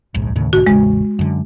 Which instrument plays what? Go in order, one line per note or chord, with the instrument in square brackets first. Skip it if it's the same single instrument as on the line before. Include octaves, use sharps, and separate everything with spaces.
[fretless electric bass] D1 A#1 G#2
D#2 A2 C#3
[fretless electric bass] B1 G#2 D3 [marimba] F#4
[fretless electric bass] E1 A1 C#3 [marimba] G#3
[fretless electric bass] F#2 D3